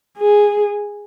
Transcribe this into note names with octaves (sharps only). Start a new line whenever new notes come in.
G#4